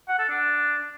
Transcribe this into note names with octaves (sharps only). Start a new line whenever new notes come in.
F#5
A4
D4